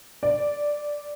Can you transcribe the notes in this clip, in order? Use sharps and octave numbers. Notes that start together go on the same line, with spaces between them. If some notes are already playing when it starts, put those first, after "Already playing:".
D5